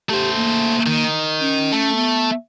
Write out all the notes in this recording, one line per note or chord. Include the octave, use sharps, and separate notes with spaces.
A3 G4 C5
A#3
D#3
C#4
A3
B3